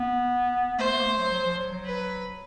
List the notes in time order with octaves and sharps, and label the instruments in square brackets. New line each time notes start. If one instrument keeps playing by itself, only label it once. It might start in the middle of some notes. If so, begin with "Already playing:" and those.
Already playing: [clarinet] B3
[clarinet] A3 [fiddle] C5
[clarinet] A3
A#3
A3
F#3
F#3
F3
F#3
F#3
[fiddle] B4